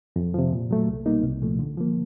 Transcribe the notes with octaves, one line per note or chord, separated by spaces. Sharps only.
F2
C3 F3
A#2
F#3 A3
C2
B2 G3 A#3 D#4
C2
A#2 F3 A3
D3
F3 A#3